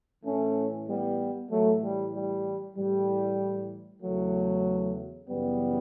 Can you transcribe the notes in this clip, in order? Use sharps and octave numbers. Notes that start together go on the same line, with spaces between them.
A2 E3 A3 C#4
G3 B3
A2 E3 F#3 A3
G3
G3
A2 E3 G3
E2 C#3 E3 F#3 A3
F#2 C#3 E3 G3 B3